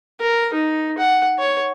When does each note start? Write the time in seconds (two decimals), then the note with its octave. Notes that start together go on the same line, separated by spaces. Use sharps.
0.20 A#4
0.53 D#4
0.98 F#5
1.39 C#5